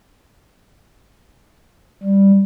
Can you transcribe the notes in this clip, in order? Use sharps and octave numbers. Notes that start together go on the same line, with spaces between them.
G3